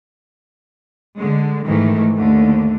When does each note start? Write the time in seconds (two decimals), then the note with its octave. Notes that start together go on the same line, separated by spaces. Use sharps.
1.16 D3 G#3
1.66 G#2 D#3 E3 A3
2.17 D#2 D3 A3